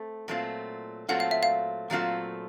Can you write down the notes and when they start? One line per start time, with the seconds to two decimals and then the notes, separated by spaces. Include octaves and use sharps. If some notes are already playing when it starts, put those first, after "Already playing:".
Already playing: A3 C4
0.28 A#2 F#3 A3 C4 F4
1.09 A#2 F#3 A3 C4 F4 F#5
1.20 F5
1.31 E5
1.43 F5
1.90 A#2 F#3 A3 C4 F4